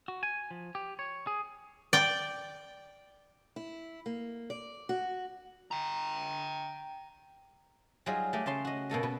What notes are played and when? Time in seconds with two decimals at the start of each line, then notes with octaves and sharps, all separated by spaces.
0.08 F#4
0.23 G#5
0.51 F3
0.75 G4
0.99 C#5
1.27 G#4
1.93 D5 G5
3.56 E4
4.06 A#3
4.50 D5
4.89 F#4
5.71 G5 A#5
8.06 F#3 G3 D#4 F4 G#4 D#5
8.33 A3 G4 D5 D#5
8.46 C#3 C#4 A5 C6
8.65 F#4 D#5
8.90 B2 A#3 A4 D#5
9.03 B2 B4